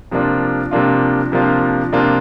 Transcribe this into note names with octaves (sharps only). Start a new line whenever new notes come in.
C3 F3 A#3 D4 F4
C3 F3 A#3 D4 F4
C3 F3 A#3 D4 F4
C3 F3 A#3 D4 F4